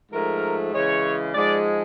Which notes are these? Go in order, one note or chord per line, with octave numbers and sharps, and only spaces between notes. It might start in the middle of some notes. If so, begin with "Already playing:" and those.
G#2 F3 A3 A#4
C#3 E3 G#3 C#5
G#2 F3 G#3 D5